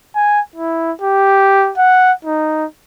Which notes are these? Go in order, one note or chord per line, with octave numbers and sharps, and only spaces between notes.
G#5
E4
G4
F#5
D#4